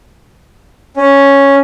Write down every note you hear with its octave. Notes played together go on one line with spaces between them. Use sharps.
C#4